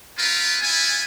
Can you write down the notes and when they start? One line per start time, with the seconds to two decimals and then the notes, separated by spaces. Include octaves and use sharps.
0.17 B3 C4 F4 A#4 B4
0.60 B3 E4 F4 G#5